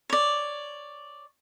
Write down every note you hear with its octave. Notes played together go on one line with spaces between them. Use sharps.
C#5 D5